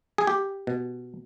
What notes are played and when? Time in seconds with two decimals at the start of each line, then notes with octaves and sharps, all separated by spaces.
0.18 G#4
0.27 G4
0.67 B2